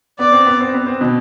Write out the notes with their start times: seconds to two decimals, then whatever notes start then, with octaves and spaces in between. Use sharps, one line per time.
0.19 B3 D5
0.32 C4
0.47 B3
0.60 C4
0.74 B3
0.87 C4
1.01 B2 B3